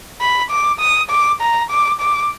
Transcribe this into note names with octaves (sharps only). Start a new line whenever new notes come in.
B5
D6
D#6
D6
A#5
D6
D6